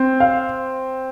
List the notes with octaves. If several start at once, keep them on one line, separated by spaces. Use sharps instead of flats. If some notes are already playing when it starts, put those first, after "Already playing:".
Already playing: C4
F5